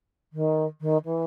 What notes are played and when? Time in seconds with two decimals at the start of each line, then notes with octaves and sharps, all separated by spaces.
0.33 D#3
0.81 D#3
1.05 E3